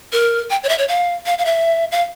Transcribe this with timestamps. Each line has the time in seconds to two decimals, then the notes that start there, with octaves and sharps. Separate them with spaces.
0.13 A#4
0.50 G5
0.63 C#5
0.69 E5
0.78 C#5
0.88 F5
1.26 F5
1.38 F5
1.45 E5
1.92 F5